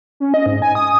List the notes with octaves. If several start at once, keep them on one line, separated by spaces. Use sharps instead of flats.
C#4
D#5
G#2
G#5
D#6